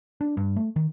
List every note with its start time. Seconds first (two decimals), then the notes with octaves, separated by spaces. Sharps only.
0.21 D4
0.37 G2
0.56 A3
0.76 D#3